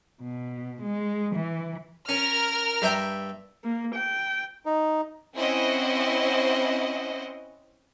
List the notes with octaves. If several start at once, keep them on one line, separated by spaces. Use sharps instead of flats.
B2
G#3
E3
C#4 A#4 F6
G2 E5 G5
A#3
G5
D#4
C4 C#4 E4 C5 D#5 F#5